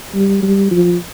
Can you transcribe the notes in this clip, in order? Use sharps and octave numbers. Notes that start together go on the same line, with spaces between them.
G3
G3
F3